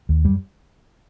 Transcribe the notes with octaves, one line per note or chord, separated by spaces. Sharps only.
D#2
F#2 G3